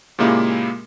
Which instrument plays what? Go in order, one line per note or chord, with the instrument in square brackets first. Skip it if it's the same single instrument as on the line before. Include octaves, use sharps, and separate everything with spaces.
[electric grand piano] A#2 C#3 G#3 A#3 E4 G4